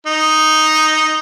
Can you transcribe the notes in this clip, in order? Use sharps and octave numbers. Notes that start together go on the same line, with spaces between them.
D#4